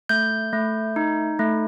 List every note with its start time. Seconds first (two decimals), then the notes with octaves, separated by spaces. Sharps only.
0.09 A3 G6
0.53 A3
0.96 D#4
1.39 A3